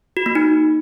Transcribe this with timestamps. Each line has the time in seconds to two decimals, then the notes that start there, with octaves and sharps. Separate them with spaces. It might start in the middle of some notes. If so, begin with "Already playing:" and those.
0.17 F#4
0.26 A#3
0.35 D#4